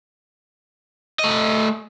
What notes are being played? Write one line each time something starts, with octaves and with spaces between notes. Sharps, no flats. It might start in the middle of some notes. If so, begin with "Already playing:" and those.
A3 D#5